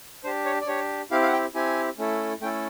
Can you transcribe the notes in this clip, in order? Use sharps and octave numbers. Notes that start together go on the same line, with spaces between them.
D4 G4 C5
C#5
D5
D4 G4 C#5
C4 E4 G4 F5
F5
F#5
G5
C4 E4 G4 G#5
A3 C#4 E4 A4
A3 C#4 E4 A4 G5